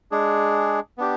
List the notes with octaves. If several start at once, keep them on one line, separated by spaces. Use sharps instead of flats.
G#3 D4 G#4
B3 D4 G4